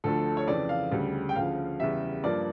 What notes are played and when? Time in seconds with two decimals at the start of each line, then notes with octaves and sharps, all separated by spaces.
0.04 D2 D3 F3 A3 A4
0.37 C#5
0.47 F2 C#3 E3 D5
0.69 F5
0.92 D2 C#3 G3
1.29 G5
1.35 D2 C#3 F3 F5
1.79 E2 C#3 G3 E5
2.24 G2 F3 A#3 D5